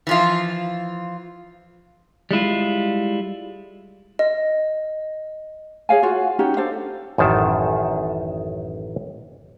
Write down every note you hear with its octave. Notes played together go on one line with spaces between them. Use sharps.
E3 F3 F4
G3 G#3 E4 F4
D#5
G#4 C#5 F5 G#5
F4 F#4
C#4 D#4 F#4 G4
D4 A4 C5 F5
A1 F#2 D#3 A5